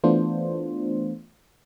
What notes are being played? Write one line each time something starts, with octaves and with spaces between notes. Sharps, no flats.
E3 A3 B3 D4 F4 C5